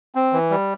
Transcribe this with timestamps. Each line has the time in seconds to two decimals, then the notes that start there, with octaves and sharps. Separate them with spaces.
0.15 C4
0.33 E3
0.50 G3